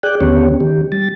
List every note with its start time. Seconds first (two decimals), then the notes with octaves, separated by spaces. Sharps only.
0.03 G#4 D5 G5 F#6
0.21 D#2 D3 B3 C#4 G4 C#5
0.60 D#3 G4
0.92 G3 A6